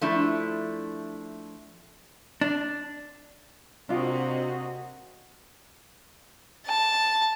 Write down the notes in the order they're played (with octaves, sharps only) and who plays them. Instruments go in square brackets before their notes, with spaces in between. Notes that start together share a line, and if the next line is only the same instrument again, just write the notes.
[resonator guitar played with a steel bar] F3 A3 D4 E4
[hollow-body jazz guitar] D4
[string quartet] C3 A#3 [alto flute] C4 [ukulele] D4 F4 [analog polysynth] F#4 D#5
[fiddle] A5